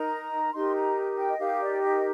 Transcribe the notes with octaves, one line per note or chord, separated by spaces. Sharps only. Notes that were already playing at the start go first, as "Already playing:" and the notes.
Already playing: D#4 A#4 A#5
D#4 G4 A#4 C6
A#5
G5
D#5
D#4 G4 A#4 F5
D5
D#5